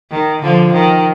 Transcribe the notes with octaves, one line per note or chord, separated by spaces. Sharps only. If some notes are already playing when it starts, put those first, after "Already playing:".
D#3
D3 F3
D#3